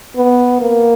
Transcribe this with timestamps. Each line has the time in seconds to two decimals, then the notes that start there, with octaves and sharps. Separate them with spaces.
0.16 B3
0.61 A#3